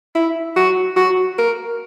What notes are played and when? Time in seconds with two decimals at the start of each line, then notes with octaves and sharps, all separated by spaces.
0.15 E4
0.56 F#4
0.97 F#4
1.38 A#4